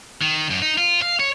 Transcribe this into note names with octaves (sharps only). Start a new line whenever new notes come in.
D#3
F#2
D#4
F4
F5
C#5